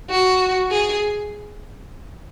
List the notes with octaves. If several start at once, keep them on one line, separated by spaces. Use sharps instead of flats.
F#4
G#4